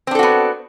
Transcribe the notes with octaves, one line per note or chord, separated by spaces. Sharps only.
B3 C4 D4 F#4 A4